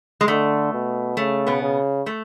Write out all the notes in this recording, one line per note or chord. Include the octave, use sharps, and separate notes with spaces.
G#3
D3 A3
B2
C#3 A3
B2 B3
C#3
A3